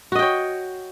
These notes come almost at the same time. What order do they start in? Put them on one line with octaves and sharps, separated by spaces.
F#4 D#5 G5 C#5